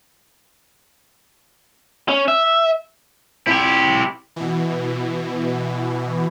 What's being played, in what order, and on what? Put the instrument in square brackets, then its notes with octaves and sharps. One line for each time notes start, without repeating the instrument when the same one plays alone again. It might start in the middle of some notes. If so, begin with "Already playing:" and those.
[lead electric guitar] C#4
E5
[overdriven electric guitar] E4 G4
[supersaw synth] B2 E3